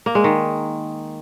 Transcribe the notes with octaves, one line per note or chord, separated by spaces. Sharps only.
A#3
G#3
D#3